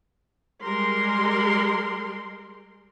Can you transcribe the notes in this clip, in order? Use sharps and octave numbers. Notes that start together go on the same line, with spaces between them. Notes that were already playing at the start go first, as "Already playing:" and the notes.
G3 G#3 A#4 C6